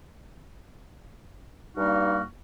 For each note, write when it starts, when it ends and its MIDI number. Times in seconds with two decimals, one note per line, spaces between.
1.76 2.21 43
1.76 2.21 55
1.76 2.21 58
1.76 2.21 63
1.76 2.21 66
1.76 2.21 89